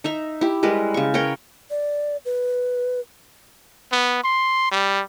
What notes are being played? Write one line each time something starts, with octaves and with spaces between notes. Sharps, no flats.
D#4 E5 A#5
E4 G4
G3 G#3 A#4 B4
C#3 C#6
A#4 B4 C#5 G5
D5
B4
B3
C6
G3